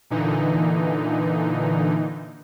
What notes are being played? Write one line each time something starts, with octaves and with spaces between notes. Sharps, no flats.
A#2 D3 E3 D#4